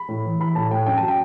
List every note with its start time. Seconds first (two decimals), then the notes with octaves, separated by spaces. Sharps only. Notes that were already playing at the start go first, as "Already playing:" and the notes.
Already playing: B5
0.09 A2
0.25 E3
0.40 E3 B5
0.55 A2 A5
0.71 A2 G5
0.86 F#2 G5
0.97 F#3 A5
1.08 G5